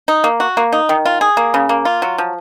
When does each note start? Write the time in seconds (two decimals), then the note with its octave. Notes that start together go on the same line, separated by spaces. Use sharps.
0.08 D#4
0.24 A#3
0.40 F#4
0.57 A#3
0.73 D#4
0.89 D#3
1.05 F4
1.21 G#4
1.37 A#3
1.54 C#3
1.69 A#3
1.85 F4
2.02 F#3
2.18 F3